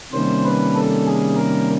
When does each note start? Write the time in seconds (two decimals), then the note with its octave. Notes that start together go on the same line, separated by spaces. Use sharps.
0.13 C3 D#3 G3 A#3 C#4 C5
0.44 B4
0.75 A4
1.06 G#4
1.37 A#4